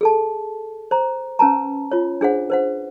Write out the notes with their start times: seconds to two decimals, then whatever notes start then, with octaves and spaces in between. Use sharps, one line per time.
0.01 G#4 A4 A5
0.91 C5 A#5
1.39 C#4 B4 A5 A#5
1.91 F4 C#5
2.21 D4 G#4 C5 F#5
2.50 B4 C5 F#5